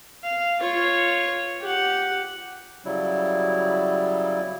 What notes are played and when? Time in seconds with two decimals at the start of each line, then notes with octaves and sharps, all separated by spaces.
0.23 F5
0.60 F4 C#5
1.61 G4 F#5
2.85 C#3 F#3 G3 E4